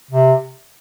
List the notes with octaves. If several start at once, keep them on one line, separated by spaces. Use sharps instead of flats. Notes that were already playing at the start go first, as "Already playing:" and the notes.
C3